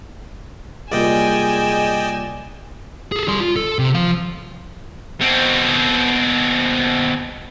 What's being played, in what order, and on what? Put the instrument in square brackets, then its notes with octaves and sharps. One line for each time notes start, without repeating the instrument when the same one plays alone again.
[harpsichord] C2 A#2 [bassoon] G#3 [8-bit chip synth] D5 D#5 G5 [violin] G#5 E7
[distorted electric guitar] G#4 A4
G3 C6
F4
A4
C3
F3 F5
B2 C4